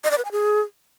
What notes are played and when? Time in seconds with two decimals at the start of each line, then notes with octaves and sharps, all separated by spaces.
0.04 D#5
0.11 D5
0.18 B4
0.25 G#5
0.32 G#4